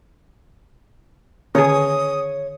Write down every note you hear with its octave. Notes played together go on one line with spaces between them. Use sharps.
D3 D#3 C#4 G#4 C#5 D#6